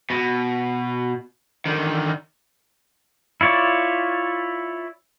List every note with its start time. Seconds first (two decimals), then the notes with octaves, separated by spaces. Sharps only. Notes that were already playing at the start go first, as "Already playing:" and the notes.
0.10 B2
1.66 D3 D#3
3.41 E4 F4 C#5 D5